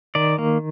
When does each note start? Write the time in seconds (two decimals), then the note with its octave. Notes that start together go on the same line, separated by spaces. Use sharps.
0.15 D#3 D5
0.38 A#3